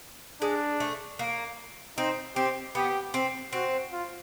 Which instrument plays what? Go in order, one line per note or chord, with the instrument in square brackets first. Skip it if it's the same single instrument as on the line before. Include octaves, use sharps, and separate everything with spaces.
[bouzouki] G#3 [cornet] D4
[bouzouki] A3
A#3
[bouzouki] C4 [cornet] D#4
[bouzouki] C4 [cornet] G4
[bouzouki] B3 [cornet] G4
[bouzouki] C4
[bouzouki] C4 [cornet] F#4
[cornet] F4